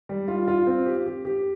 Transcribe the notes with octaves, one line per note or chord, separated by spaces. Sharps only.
G3
F4
F4
C4
G4
G4
G4